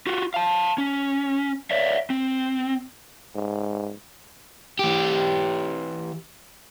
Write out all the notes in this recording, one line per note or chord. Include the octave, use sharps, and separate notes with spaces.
F4 F#4
F5 A5
C#4
C#5 D5 E5
C4
G#2
E3 G4